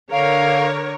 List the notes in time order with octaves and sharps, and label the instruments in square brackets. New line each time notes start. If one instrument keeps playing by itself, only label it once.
[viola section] D3 A#4 C#5 [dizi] F5